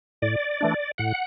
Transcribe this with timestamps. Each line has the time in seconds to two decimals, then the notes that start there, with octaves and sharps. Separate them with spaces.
0.22 A2 D5
0.61 E3 A3 D4
0.98 A2 F#5